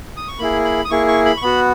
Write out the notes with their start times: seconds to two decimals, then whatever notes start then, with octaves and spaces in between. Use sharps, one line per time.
0.17 D#6
0.28 C#6
0.39 A#3 E4 G#4 B5
0.65 B5
0.85 D#6
0.90 A#3 E4 G#4 C#6
1.08 C#6
1.25 B5
1.37 C#6
1.42 B3 F#4 B5